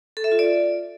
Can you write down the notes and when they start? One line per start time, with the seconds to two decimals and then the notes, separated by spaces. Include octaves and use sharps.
0.17 A4
0.24 E5
0.32 F4
0.39 D5